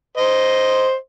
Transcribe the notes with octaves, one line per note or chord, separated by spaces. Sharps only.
C5 D#5